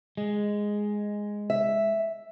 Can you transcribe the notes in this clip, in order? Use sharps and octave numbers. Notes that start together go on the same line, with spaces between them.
G#3
E5